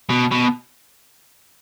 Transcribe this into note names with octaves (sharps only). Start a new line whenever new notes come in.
B2
B2